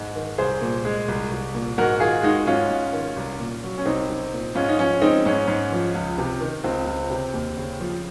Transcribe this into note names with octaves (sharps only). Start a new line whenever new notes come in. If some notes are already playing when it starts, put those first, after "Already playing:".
Already playing: G#2
D#3
C2 G#4 C5
A#2
G#3
C2
C2
A#2
G#2 F#4 A#4
D#3 F4 G#4
G#3 D#4 F#4
G#2 C#4 F4
G#2
D#3
C2
A#2
F#3
C#4
C2 C4 D#4
C2
A#2
G#2 C#4 F4
D#4
F3 C#4
G#3 C4 D#4
G#2 C#4
G#2
F3
C#2
C3
D#3
C#2 C4
C#2
C3
D#2
C#3
F3